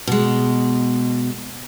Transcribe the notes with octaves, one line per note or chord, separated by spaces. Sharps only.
B2 G#3